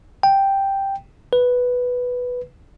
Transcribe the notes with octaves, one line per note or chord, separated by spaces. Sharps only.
G5
B4